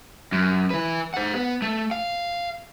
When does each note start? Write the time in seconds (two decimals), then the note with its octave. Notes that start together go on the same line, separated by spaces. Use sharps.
0.32 F#2
0.71 E3 B4
1.14 C5 F#5
1.35 B3
1.62 A3
1.91 F5